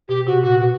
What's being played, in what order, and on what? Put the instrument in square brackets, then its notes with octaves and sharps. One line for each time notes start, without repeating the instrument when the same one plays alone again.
[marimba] B2 [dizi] G4
[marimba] C3 [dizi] F#4
[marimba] A#2 [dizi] F#4
[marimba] B2 [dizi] F#4